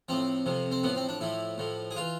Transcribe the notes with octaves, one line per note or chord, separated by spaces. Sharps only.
A2 F3 C4
F2 C3 F3
C4
A2 F3 B3
C4
D4
A2 F3 E4
A2 F3
G#4
E3 F4